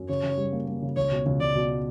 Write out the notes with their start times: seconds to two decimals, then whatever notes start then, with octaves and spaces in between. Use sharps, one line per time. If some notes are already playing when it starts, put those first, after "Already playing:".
Already playing: F#2
0.09 C#3 C#5
0.23 C#3
0.37 G3
0.53 A#3
0.68 A#3
0.82 C#3
0.96 C#2 C#5
1.11 B2
1.26 C#2
1.41 C#2 D5
1.55 B2